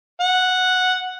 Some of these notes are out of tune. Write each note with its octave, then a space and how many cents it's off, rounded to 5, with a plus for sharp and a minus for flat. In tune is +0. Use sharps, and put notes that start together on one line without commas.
F#5 -5